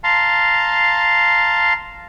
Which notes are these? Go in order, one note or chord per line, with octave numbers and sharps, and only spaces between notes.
F5 A5 A#5 C6